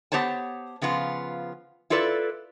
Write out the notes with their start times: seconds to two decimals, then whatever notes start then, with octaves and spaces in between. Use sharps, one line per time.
0.12 B3 G4 C5 C#5 A5
0.82 C#3 F3 B3 F4
1.90 E4 F4 A4 B4 D5